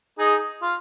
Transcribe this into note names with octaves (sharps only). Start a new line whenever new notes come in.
D#4 G#4
F4